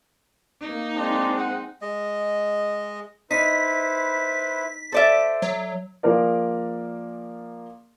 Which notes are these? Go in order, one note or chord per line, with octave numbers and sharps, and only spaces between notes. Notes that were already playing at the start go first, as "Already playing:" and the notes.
A#3 D#4
G#3 C4 D4
D#4 F#5
G#3 D#5
D#4 E4 B4 C5 B6
A4 C5 D5 E5
F#3
F3 A#3 G#4 A#4 D5